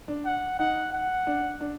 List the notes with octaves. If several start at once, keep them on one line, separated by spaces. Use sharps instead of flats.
D4
F#5
D#4 F#5
F#5
D4
D4